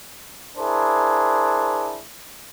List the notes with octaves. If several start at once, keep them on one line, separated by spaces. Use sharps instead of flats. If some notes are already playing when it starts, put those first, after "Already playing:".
D4 E4 G#4 A#4 C5